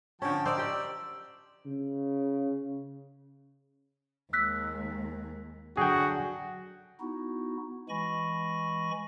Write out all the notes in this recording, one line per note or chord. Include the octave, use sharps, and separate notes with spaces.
D3 F3 C#4 G5 A5
A#4 C5 D5 D#5 E6
G4 G5
C#3
D#2 G#3 E6 F#6 B6
D3 F#3 F#4 G#4 G5
B3 D#4 E4 F#4
E3 G#3 G#5 B5 C#6 A#6